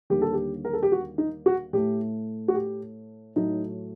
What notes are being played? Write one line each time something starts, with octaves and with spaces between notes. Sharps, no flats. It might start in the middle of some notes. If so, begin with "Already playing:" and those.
D#2 D3 G3 A#3 G4
A4
G4
A#4
A4
G4
F#4
D#4
F#4
A2 A3 G4
F#4
G4
A2 F#3 A3 D#4